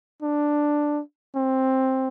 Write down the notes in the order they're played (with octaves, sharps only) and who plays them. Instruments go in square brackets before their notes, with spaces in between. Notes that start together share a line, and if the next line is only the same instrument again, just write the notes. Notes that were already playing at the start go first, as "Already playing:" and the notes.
[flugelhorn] D4
C4